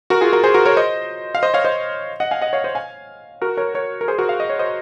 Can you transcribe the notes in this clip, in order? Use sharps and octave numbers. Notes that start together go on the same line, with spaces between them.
F#4 A#4
F4 G#4
F#4 A#4
G#4 C5
F#4 A#4
A#4 C#5
C5 D#5
F5
C5 D#5
C#5 F5
C5 D#5
D#5 F#5
F5 G#5
D#5 F#5
C#5 F5
C5 D#5
F5 G#5
F#4 A#4
A#4 C#5
A#4 C#5
A#4
G#4 C5
F#4 A#4
F5
D#5
C#5
C5 D#5